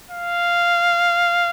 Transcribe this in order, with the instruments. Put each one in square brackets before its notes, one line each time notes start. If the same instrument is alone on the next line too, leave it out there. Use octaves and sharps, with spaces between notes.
[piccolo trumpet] F5